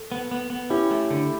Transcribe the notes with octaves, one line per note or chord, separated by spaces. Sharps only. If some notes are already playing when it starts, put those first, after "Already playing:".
Already playing: A4
B3
B3
B3
C#4 E4 G4
A3
D3